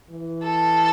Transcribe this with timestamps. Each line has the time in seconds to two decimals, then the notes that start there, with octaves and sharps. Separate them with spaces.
0.10 E3
0.43 A4